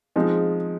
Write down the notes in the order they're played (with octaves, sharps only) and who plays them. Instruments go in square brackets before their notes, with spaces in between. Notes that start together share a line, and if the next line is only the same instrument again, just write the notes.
[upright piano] F3 G#3 C4 D#4